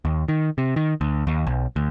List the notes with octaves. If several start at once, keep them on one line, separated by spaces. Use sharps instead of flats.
D#2
D#3
C3
D#3
D2
D#2
B1
D2